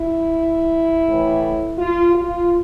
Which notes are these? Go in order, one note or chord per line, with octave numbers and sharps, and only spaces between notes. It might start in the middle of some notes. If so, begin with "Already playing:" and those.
Already playing: E4
A2 E3
F4
F4